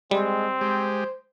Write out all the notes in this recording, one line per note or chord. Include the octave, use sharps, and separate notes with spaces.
G3 G#3 C4
G#3 G4 C5